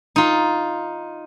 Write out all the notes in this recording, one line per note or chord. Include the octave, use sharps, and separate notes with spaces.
D#4 F4